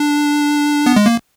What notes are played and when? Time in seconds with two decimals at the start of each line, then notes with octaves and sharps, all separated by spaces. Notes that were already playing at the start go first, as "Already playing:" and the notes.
Already playing: D4
0.86 B3
0.96 G#3
1.06 A#3